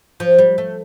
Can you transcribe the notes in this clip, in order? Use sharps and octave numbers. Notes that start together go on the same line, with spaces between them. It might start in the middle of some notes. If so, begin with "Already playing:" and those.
F3
G3
A3